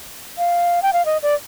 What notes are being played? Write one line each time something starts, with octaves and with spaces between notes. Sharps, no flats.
F5
G5
F5
D#5
D5